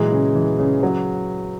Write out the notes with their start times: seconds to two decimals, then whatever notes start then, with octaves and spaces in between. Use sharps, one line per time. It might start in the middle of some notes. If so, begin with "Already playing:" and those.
Already playing: A#2 E3 F#3 G#3
0.12 C#3
0.35 E3
0.59 C#3
0.83 F#3